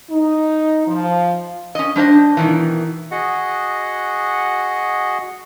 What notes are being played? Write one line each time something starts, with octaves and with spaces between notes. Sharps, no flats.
D#4
F3
C#4 D#5
G3 D4 C5 D#5
B2 D#3 E3
F#4 G#4 D#5 F#5